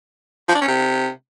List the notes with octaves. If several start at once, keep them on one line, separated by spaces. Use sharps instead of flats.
F3
D4
C#4
C3